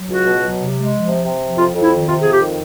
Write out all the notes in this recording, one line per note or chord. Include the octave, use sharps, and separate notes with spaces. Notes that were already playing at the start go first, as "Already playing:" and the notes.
Already playing: F#3
C#2 F#4
B2
F#3
C3
G#3
F3
C3
C3
F3
F2 F4
F2
E4
D#3
C3 F4
F2 G#4
G4
D#3